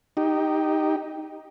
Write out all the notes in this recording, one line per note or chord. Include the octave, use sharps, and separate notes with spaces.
D#4 G4